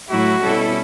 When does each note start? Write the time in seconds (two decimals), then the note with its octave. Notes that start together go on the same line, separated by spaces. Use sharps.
0.10 A2 F#3 A3 E4 F#4
0.43 B2 G3 C#4 E4 A4